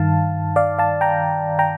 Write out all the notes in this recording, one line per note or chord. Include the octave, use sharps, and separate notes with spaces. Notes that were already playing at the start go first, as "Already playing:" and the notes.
Already playing: G2 D#3 F5 A5
D5 F5
F5 A5
G5 A#5
G5 A#5